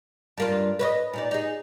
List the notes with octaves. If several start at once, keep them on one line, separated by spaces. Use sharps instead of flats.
G2 A#3 F4
B4 C#5 D#5
A#2 D#4 D5
D#4 G#4